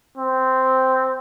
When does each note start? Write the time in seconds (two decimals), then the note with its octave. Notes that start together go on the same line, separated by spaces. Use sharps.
0.18 C4